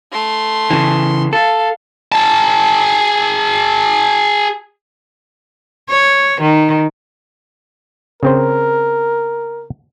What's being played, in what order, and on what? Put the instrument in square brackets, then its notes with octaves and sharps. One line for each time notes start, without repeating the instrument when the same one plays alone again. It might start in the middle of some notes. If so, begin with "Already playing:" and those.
[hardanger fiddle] A3 C6
[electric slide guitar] C#3 E3
[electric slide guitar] A4 [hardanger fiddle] F5
[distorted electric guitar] G#4 A5
[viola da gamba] C#5
D#3
[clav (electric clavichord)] C#3 C4 C5 [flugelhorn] A#4